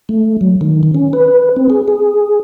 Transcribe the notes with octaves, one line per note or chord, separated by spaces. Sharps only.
A3
F#3
D#3
D#3
C#4
B4
C4
G#4
G#4